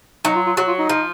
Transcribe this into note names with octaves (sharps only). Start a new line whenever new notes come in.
F#3 D#4
F4
F4
F#3 F#4
F4
D#4
F3